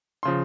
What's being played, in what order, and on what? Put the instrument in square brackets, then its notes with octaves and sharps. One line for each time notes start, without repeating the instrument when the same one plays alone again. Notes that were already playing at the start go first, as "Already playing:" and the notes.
[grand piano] C#3 F3 C6